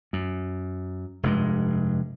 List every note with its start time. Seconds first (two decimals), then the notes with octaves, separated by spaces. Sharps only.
0.13 F#2
1.23 F1 G2 G#3